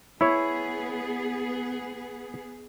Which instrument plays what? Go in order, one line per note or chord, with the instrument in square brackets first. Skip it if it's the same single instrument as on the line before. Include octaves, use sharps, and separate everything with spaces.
[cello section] B3 G#4 [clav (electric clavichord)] E4 C#5